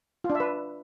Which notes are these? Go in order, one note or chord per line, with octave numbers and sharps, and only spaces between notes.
F4
D4
E5
B4